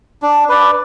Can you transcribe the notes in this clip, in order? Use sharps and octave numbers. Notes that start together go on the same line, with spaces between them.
D4
B4 D5